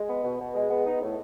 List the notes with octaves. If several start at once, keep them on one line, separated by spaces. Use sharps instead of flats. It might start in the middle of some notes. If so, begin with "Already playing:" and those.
Already playing: G#3
B3
B2
B2
G#3
B3
D#4
A2